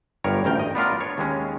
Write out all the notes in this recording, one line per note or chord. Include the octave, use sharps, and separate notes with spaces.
G1 G2 A#4 C#5
A1 D2 A#4 G5
D#5
B3 D4 F4 A#4
C#5
D#2 G#3 C#4